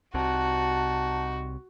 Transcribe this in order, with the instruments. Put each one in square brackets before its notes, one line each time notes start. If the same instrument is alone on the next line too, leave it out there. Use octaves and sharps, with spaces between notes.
[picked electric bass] C2 C3 [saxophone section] D#4 F#5 [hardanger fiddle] F#4 [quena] A5